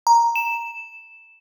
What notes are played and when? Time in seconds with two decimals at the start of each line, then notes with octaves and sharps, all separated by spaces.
0.07 A#5
0.36 E7